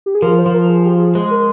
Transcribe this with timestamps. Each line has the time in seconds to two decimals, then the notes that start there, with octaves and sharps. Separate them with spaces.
0.06 G4
0.15 G#4
0.22 F3 A#4
0.39 C5
0.46 F3
0.54 A#4
0.69 G#4
0.85 G4
1.00 G#4
1.15 G#3 C5
1.31 A#4